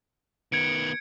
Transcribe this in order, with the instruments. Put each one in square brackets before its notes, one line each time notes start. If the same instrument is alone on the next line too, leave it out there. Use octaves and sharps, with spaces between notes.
[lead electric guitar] D#3 B3 [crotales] G#6 C#7 D7